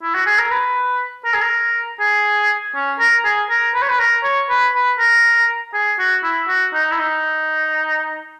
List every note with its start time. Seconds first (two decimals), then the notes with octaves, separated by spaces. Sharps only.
0.03 E4
0.14 F#4
0.26 G#4
0.38 A#4
0.51 B4
1.25 A#4
1.33 G#4
1.42 A#4
2.00 G#4
2.75 C#4
2.99 A#4
3.25 G#4
3.50 A#4
3.74 B4
3.82 C#5
3.89 B4
3.99 A#4
4.23 C#5
4.49 B4
4.74 B4
4.99 A#4
5.74 G#4
5.99 F#4
6.23 E4
6.48 F#4
6.73 D#4
6.91 E4
6.99 D#4